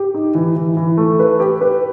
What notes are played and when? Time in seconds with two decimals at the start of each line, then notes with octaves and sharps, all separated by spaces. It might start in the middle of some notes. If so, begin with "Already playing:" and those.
Already playing: G4
0.14 D#4
0.35 E3
0.56 E3
0.77 E3
0.97 A3
1.19 B4
1.40 G4
1.61 B4